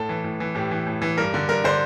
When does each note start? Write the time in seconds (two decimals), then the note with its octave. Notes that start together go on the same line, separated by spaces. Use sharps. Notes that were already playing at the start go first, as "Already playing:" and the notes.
Already playing: A2 A4
0.09 E3
0.24 A2
0.40 E3
0.55 A2 G4
0.71 E3
0.87 A2
1.02 E3
1.18 G2 A#4
1.34 D3
1.49 G2 A#4
1.64 D3 C5